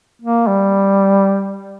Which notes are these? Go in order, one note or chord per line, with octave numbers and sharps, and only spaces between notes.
A#3
G3